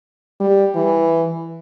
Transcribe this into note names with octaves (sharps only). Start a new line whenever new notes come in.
G3
E3